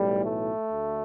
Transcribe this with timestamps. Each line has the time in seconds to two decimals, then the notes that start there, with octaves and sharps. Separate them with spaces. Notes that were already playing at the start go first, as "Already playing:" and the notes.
Already playing: B1 A2 E3 G3
0.23 A3
0.68 D2 D3